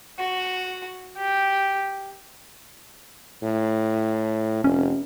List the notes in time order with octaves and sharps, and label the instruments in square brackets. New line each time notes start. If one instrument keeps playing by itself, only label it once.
[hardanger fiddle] F#4
G4
[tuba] A2
[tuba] F1 [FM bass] C#4